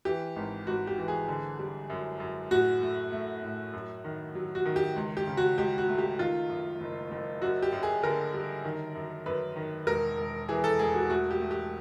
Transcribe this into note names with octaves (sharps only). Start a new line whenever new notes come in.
E3 G4
G#1
G#1 F#4
G4
E3
G#4
D3
G3
F#2
F#2
A2 F#4
A3
A3
A2
F#2
D#3
F#3
F#4
D#3
G4
C#2
G4
C#3
F#4
C#2 G4
F#4
A3
G4
D#3 F4
F#2
F#1
F#1
F#2 F#4
G4
F#2
G#4
D3 A#4
G3
D#3
F#2
F#2 B4
D#3
E1 A#4
E1
E3 G#4
A4
E1 G#4
F#4
A3 F#4
G4
A3
G4